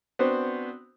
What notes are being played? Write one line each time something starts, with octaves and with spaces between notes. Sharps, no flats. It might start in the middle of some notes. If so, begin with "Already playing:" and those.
B3 C4 D4 F#4 C5